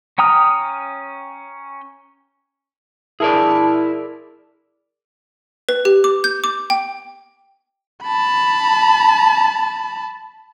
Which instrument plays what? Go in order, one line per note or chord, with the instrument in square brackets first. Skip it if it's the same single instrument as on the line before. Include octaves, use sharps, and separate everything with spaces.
[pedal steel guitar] C#4 G5 A#5 D#6 F6
[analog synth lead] E4 [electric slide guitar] G#4 A#4 D5 [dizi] A5
[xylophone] B4
G4
D6
G6
D6
G5
[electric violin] A5 B5